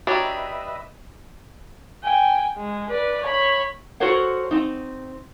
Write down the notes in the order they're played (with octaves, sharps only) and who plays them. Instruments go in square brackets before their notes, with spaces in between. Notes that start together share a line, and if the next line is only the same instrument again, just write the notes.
[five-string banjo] D4 G4 [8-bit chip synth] F#4 C#5 A#5 [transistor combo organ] B4 D#5 E5
[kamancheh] G5 G#5
G#3
B4 D5
C#5 B5
[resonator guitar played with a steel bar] F#4 A4 A#4 C5 C#5 F#5
C4 D#4